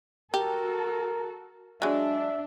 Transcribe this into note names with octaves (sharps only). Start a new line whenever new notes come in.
F#4 G4 A4 A#4
F#3 G#3 D4 E5